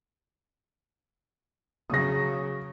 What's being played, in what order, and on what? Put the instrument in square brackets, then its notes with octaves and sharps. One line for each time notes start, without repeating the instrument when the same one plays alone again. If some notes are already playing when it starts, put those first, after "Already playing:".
[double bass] C#3 F#3 [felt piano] D#6 A#6